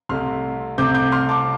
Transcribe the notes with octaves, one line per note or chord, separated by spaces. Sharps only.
C2 C3 A3 C6 F6
C2 C3 A3 C4 D6 G6
D6 G6
C6 F6
A5 D6